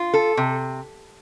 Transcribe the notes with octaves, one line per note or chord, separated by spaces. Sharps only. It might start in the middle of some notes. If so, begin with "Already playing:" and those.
Already playing: F4
A4
C3